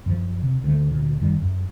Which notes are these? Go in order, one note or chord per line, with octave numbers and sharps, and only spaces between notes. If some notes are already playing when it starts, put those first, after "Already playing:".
F#2 F3
C3
D2 A3
D2 A#2
F#2 D#3 G3
F#2